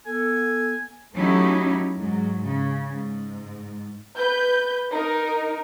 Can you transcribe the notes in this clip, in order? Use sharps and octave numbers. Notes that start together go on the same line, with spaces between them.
B3 A4 G#5
F#3 A3 C#4 D#4 E4 G4
G#2 F#3
C#3
G#2
B4 G6
D#4 A#4